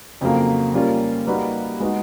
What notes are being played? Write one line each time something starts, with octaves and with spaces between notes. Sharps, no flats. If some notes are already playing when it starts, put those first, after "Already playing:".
F2 C#3 F#3 A#3
G3 A#3 C#4 F4 A#4
G3 A#3 D#4 F#4 B4
G#3 B3 D#4 F#4